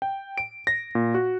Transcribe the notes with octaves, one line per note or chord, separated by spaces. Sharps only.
G5
D7
A#6
A#2
F#4